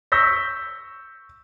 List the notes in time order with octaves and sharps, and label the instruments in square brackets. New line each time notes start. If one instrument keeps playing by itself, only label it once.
[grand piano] C#6 E6 G6 A#6 B6